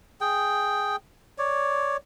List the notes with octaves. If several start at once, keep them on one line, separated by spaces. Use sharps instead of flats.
G#4 G5
C#5 D5